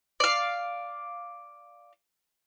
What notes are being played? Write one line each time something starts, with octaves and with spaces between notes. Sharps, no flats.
D5 F5